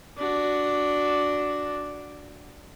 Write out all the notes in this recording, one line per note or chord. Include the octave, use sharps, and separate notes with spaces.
D4 F#4